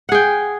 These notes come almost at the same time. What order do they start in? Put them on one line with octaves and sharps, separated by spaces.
F#5 G#4 G5